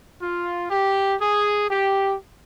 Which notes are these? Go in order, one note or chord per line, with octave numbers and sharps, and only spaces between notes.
F4
G4
G#4
G4